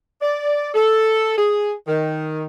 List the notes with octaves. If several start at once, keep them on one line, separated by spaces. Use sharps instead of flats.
D5
A4
G#4
D#3